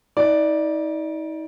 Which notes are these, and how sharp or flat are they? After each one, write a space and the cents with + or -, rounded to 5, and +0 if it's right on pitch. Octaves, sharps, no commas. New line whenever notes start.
D#4 +40 D5 +0